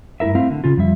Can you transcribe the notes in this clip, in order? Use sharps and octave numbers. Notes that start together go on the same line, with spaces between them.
G2 A3 E4 A#4 E5
A3 C4 E4 F5
D3
C#3 C#4 F4
F2 G3 E5